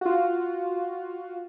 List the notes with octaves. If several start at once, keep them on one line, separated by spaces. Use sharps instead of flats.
F4 F#4